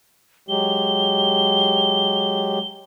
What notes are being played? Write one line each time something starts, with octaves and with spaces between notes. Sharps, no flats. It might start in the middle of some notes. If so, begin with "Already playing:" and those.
F#3 G#3 G4 G7